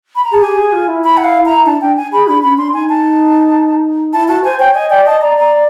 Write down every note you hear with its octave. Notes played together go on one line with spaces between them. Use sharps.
B5
A#5
G#4 A5
G4 G#5
G#4
F4
E4
B5
F#5
F5
A#5
D4 A5
D4 G5
G#5
G#4 B5
D4 B5
C#4 B5
D4 C6
D#4 G#5
A5
E4 A5
F#4 A5
C5 G#5
C#5 G5
D#5 G#5
D5 G5
D#5 A5
D5 A#5
A#5